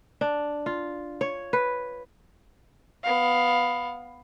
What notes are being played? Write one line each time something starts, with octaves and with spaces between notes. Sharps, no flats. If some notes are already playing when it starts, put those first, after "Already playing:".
D4
F4
C#5
B4
B3 F5